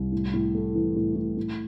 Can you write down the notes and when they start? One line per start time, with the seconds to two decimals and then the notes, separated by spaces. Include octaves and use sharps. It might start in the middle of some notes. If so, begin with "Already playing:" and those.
Already playing: C2
0.12 A2
0.33 A2
0.55 A3
0.75 E3
0.96 A2
1.16 A2
1.37 A2